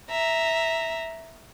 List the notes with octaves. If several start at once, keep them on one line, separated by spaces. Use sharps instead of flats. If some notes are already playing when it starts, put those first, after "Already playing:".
E5 A#5